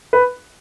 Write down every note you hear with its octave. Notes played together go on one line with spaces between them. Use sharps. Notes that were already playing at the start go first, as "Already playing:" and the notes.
B4